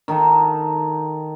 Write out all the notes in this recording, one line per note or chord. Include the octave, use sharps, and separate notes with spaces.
D#3 D#4 A4